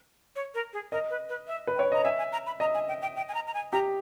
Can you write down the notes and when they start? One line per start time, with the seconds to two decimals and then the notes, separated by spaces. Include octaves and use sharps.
0.36 C#5
0.54 A#4
0.73 G#4
0.92 A#4 D#5
1.10 B4
1.29 B4
1.47 E5
1.67 B4
1.76 C#5 G5
1.92 D#5 A#5
2.04 E5 G#5
2.18 G#5
2.32 A#5
2.47 B5
2.60 D#5 A#5
2.74 G#5
2.88 G5
3.02 G5
3.16 G5
3.29 G#5
3.34 A#5
3.47 A#5
3.54 G#5
3.73 G4 A#5